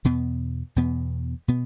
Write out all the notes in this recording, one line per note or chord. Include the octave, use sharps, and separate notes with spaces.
E2 B2 B3
E2 B2 B3
B2 B3